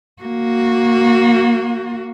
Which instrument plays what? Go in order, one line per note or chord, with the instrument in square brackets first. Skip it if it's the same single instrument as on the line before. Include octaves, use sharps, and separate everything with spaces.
[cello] A#3 F#4